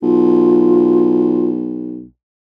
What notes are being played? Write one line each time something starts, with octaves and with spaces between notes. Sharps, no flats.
B1 F4